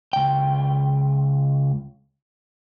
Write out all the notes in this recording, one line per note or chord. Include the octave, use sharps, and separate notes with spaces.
C#2 G5